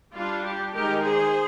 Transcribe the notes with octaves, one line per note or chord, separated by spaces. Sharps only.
G3 D4 F4
G4
D#3 G#3 D#4 G4 A#4
G#4 C5